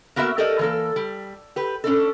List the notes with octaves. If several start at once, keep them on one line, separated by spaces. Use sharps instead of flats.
A#3 B3 F#4 A#4 E5
G4 A4 A#4 D5 D#5
E3 A#3 A4
G3
G4 B4
C#4 D4 A4